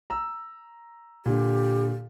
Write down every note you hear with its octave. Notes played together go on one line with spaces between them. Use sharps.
A#5 E6
A#2 D3 G4